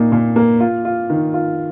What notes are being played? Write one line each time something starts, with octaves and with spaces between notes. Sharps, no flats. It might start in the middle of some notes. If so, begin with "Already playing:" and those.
Already playing: A#2 A#3 D#4
A#2
A#3
F4
F4
D#3
F4